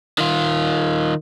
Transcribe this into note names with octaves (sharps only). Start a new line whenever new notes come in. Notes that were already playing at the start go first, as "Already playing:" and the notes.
D#3 F4